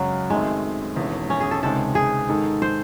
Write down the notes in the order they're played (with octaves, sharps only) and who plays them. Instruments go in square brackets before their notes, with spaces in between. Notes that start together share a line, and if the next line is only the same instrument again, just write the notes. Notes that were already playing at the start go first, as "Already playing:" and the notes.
Already playing: [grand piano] F#2 C#3 G#3 [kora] F#3
[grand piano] F#2 D#3 A3 C4 [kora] G#3
[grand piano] E1 E2 D#3 A3 C#4
[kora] C#4
G#4
A4
[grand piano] C#2 C3 D#3 G#3 [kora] A4
[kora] G#4
[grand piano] G#2 D#3 G#3 D#4 A4
[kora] C5